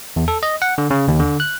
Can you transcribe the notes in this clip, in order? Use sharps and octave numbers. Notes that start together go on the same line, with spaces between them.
E2
A4
D#5
F#5
D3
C#3
D#2
D3
F#6